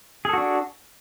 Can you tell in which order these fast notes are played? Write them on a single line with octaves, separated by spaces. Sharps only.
G#4 A4 F#4 D4